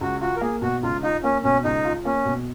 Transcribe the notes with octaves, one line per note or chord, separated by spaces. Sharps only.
C#2 F#4
F4 F#4
A#4
A#3 G#4
B2 F#4
C#2 F4
D#4 F4
A#3 C#4
B2 C#4
C#2 D#4
F4
A#3 C#4
B2